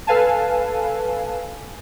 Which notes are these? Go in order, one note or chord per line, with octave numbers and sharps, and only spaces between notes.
A4 B4 F5 G#5 A5